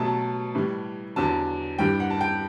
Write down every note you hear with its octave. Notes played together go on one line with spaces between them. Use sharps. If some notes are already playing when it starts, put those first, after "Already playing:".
Already playing: B2 F#3 A3 A5
A2 E3 G3
E2 D3 F#3 A5
G2 E3 G3 G5
F#5
A5
G5